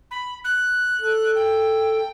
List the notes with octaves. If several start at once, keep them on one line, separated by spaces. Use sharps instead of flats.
B5
F#6
A4
G5